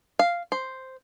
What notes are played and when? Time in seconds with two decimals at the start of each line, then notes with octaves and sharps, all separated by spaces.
0.19 F5
0.52 C5